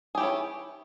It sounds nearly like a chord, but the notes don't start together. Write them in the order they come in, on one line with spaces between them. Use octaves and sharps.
G#4 G4 E4 C#5